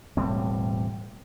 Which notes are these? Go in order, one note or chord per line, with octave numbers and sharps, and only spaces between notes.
E1 A2 G3 C4